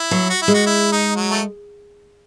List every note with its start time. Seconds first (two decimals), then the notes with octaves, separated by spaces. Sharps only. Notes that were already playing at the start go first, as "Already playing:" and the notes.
Already playing: E4
0.11 F#3
0.30 F#4
0.42 E4
0.48 G#3
0.54 F#4
0.66 E4
0.92 D#4
1.16 F#3
1.31 A3